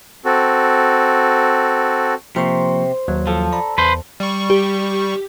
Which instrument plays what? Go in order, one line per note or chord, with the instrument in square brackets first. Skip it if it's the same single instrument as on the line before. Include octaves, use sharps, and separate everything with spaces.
[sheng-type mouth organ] C4 F#4 A4
[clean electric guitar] C3 [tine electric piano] F3 A#3 C#6 [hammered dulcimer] C5
[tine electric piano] D#2 F#3
[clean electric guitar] F3 [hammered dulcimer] A4
[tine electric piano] D5 A#5 B5
[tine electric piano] E2 [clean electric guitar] B4 C5
[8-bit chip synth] G3 C#6
[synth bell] G4